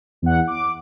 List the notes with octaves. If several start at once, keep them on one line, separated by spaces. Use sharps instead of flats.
E2 F#5
D6